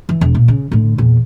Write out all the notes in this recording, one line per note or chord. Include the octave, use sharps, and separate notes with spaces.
E3
E1
A#2
C#3
A2 D3
E2 A#2